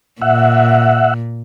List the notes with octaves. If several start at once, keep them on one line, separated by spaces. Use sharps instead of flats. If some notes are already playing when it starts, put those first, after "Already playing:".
A#2 E5 F#5